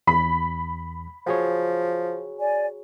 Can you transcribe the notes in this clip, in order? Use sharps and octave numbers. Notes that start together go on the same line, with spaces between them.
E2 B5
F3 F#4 G#4 C#5
D5 G#5